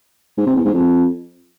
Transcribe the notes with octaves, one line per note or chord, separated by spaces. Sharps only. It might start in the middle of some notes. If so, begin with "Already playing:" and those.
G#2
C3
E2
G#2
F2